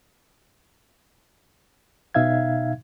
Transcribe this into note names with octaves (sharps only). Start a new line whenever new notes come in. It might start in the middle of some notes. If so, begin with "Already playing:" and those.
B2 D#4 E5 F5 G#6